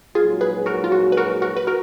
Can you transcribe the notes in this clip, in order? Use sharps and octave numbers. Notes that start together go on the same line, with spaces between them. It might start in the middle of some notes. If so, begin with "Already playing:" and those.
A#1 G#2 F#3 F4 G#4
G#4 B4
F#4 A#4
F4
F#4
B4
F#4 A#4
F#4 A#4
B4
F#4 A#4